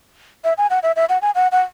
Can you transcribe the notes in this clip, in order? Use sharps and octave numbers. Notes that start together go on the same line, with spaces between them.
E5
G#5
F#5
E5
E5
F#5
G#5
F#5
F#5